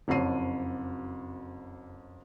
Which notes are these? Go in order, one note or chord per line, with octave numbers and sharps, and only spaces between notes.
F#1 F2 F#4 C#5 C7 D#7